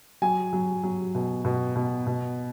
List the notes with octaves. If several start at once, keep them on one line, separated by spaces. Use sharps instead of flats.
F#3 G#5
F#3
F#3
B2
B2
B2
B2